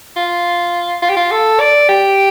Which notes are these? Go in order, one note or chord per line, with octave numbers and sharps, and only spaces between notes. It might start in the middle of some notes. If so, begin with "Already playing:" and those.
F4
F4
G4
F4
A4
D5
G4